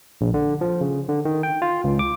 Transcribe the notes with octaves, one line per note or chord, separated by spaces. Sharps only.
A#1
D3
F3
C#3
D3
D#3
G5
F4
C#2
D6